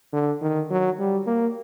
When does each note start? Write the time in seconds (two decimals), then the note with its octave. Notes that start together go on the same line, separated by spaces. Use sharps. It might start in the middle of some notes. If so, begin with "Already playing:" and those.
0.13 D3
0.41 D#3
0.70 F#3
0.99 G3
1.27 A#3